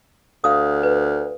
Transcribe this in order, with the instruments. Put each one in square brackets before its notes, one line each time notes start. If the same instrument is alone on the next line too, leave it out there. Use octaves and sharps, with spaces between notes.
[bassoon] D2 [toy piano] F5 D#6
[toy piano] B4